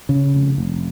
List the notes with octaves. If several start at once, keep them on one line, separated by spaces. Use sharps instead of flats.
C#3
F1
F1